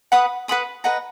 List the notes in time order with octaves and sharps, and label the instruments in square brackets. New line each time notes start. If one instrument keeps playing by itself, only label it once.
[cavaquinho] B4 F#5 B5 D#6
B4 F#5 B5 D#6
B4 D#5 F#5 A#5